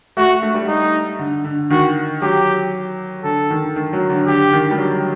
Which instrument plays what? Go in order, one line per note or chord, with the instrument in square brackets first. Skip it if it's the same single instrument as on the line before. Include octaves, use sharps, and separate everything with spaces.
[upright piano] A3 [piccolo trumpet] F#4
[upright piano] A3
G3
[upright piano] A3 [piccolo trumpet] D#4
[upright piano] D3
D3
[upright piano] D#3 [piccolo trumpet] F#4
[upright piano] F#3 [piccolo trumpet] G4
[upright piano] D3 [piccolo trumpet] A4
[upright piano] D#3
D#3
F#3
D3
[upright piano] D3 [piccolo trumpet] G4
[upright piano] D#3
G3
F#3